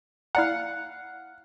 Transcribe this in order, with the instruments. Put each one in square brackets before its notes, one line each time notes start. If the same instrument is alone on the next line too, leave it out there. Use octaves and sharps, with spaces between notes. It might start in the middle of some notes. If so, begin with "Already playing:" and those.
[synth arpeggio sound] E4 D5 A#5 [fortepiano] F5 F#5